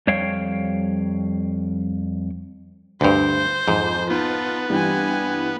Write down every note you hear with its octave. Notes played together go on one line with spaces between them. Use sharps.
F2 G3 C#5 F5 G5
D2 G2 C5
F2 G#2
B3 D#4 F4 A5
G2 E3 G3 C4 G#5